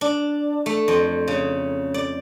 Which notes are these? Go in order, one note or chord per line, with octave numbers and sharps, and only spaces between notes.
D4
A3
F2
C#3
D5